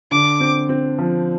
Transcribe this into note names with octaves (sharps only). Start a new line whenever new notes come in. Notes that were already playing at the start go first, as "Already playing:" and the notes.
D3 D6
C4
C4
F3